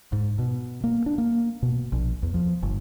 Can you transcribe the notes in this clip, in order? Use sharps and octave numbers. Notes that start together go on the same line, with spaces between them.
G#2
B2
A#3
D4
A#3
B2
A#1
E2
F3
G1